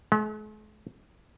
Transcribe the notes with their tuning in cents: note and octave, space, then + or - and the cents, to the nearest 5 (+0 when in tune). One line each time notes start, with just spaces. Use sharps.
G#3 +45